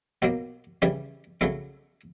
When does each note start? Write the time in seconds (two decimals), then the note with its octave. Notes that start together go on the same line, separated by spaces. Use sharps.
0.22 B2 F#3 A#3 B3
0.82 C#3 E3 G3 C#4
1.41 C#3 F#3 A3 E4